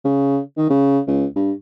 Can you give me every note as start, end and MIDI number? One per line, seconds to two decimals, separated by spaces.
0.05 0.39 49
0.57 0.65 51
0.70 1.00 49
1.07 1.25 37
1.36 1.52 43